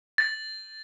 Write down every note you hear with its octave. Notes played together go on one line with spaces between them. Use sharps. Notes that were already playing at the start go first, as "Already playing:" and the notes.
A6